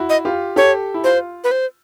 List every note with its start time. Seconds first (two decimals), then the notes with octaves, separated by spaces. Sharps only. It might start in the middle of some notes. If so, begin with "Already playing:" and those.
Already playing: E4 F#4
0.09 D#5
0.25 F4 G4
0.56 G4 A4 C#5
0.94 E4
1.04 F4 C5
1.44 B4
1.51 C5